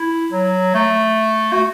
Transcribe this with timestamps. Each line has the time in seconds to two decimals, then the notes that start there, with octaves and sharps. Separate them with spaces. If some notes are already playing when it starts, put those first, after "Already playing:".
Already playing: E4
0.32 F#3
0.75 A3
1.53 F#4